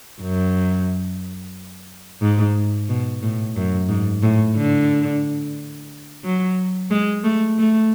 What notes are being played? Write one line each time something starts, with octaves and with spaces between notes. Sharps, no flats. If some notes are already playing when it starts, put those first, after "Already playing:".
F#2
G#2
B2
A2
F#2
G#2
A2
D3
F#3
G#3
A3
A3